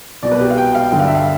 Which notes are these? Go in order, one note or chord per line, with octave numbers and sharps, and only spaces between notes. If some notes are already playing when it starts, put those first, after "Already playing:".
C2 B2 D5
B4
G4
F5
G5
F5
G2 D3 G5
F5
E5
F5